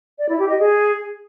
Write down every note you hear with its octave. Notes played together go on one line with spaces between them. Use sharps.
D5
E4
G4
D#5
G#4